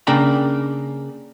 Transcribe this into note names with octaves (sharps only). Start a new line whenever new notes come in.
C#3 A#3 D4 G5 A#5 B5